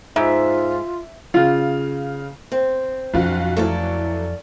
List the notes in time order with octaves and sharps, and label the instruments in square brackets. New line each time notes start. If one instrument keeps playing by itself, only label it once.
[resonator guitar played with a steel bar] G#2 [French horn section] D#4 C5 [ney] F4 [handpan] E5
[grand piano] C#3 F5 [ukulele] F4
[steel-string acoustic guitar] C4
[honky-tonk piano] B1 F4 F#4 [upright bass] F2 C#4
[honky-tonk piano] E3 F#3 A3 [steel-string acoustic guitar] A4 D5 F5